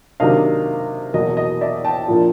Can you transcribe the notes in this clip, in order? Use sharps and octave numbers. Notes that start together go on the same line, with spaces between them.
C3 D#3 F#3 A#3 D4 D#5 F5
E2 B2 F#3 A#3 D#5
D#5
D5 E5
G5 A5
A#2 F3 A#3 D4